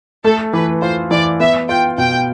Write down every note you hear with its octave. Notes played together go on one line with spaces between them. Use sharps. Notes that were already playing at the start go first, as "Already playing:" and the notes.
A3 A4
E3 B4
F4 C5
E3 D5
B3 E5
F4 G5
B2 G5